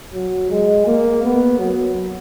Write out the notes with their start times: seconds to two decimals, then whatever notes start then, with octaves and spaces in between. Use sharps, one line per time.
0.14 F#3
0.50 G#3
0.87 A#3
1.23 B3
1.59 F#3